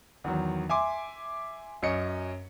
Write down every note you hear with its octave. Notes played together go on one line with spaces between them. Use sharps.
E2 D#3 F#3
E5 G#5 C6 D6
F#2 F#3 C#4 D#5 C#7